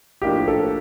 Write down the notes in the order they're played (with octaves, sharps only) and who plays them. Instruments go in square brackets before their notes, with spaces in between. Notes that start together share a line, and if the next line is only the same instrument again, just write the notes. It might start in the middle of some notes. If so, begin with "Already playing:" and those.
[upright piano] A2 F3 A#3 D4 [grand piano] G4
[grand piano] A4